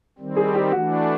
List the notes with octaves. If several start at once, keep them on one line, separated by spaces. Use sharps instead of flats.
D#3 G3 C4
G#4
G4
E3 A3 D4 F#4